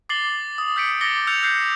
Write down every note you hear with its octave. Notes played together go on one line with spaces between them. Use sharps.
D6 A6 C7 F#7 G7
D#6
E6 G6 B6 C#7 D7
D6 A6 A#6 C#7 G7
E6 F#6 G6 C#7 F7
E6 F#6 G6 C7 C#7